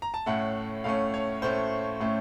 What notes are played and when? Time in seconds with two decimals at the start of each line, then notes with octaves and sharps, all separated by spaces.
0.02 A#5
0.14 A5
0.26 A2 A3 C#4 F#5
0.84 A2 A3 C#4 F5
1.14 C#5
1.42 A2 A3 C#4 C5
2.00 A2 A3 C#4